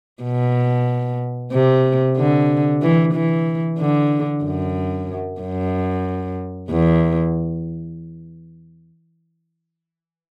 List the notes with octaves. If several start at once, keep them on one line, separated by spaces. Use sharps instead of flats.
B2
C3
D3
E3
E3
D3
F#2
F#2
E2